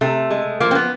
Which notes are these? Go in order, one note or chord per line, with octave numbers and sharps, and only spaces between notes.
C3 A3
G#3
F3 A#3
C4
B3